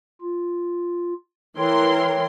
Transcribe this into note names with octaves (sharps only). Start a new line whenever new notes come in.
F4
E3 A#4 C#5 G5 C6